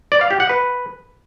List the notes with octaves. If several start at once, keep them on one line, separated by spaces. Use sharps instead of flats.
D5
F5
G4
F#5
B4